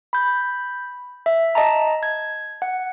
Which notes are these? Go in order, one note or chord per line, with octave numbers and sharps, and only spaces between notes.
B5 G6
E5
D#5 A5 A#5
G#6
F#5